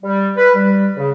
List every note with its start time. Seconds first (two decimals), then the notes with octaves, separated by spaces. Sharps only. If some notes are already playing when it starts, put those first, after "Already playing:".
0.02 G3
0.37 B4
0.55 G3
0.97 C#3